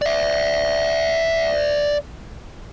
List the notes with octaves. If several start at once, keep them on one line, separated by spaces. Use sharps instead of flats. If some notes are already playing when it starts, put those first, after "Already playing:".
D5 E5